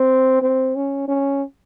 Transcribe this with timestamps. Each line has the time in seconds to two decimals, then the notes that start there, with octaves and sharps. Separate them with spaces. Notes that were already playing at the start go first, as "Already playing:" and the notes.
Already playing: C4
0.42 C4
0.76 C#4
1.08 C#4